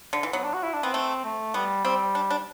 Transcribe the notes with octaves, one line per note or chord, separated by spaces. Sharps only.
D3
E3
F#3 B3
D4
F#4
E4
D4
B3 C4
A3
A3
G3 B3
G3 C4
D4
D4